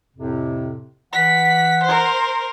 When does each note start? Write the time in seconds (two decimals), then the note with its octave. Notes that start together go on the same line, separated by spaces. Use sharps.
0.16 F2 A2 C3
1.13 E3 F#5 B6
1.84 A#4 C5